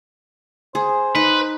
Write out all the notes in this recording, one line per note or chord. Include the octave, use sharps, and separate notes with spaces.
G#4 C5
D#4 B4